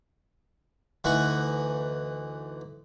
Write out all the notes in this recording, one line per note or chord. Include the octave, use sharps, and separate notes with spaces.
D2 E3 D#4 F#5 C#6